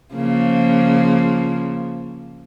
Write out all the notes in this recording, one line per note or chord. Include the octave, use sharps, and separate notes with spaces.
C#3 F3 A#3